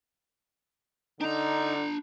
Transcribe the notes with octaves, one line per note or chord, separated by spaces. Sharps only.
D3 D4 D#4 A#5